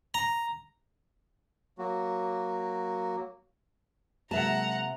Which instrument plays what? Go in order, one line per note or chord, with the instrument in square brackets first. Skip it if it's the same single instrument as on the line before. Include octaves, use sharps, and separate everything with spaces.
[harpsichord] A#5
[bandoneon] F#3 A#3 F#4
[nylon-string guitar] C3 E5 A5 [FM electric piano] F#3 G#3 A#3 [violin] F#5 A#5